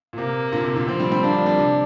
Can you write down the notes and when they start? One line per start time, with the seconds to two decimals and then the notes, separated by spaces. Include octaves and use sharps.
0.13 A#2
0.17 C3 A#3
0.52 A#2 D3
0.64 C3
0.76 A#2 D3
0.88 C3 F3 C4
1.00 D3 G3
1.12 D3 G3
1.23 F3 A#3 D4
1.35 F3 A#3
1.46 D3 G3
1.58 C3